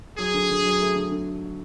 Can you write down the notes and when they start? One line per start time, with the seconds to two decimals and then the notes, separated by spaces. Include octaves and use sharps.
0.18 F#3 G#4
0.34 D3
0.50 D3
0.65 F#3
0.80 A3
0.96 D3
1.11 D3